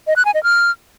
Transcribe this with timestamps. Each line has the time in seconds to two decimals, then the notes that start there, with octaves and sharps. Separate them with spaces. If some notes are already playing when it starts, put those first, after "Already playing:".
0.07 D#5
0.16 F#6
0.25 G#5
0.34 D#5
0.43 F6